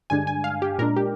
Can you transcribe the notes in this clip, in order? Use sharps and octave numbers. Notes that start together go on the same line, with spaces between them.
G2 D3 G#3 D4 G#5
G#5
F5
G4
A#2 G#3 D4 A#4
G4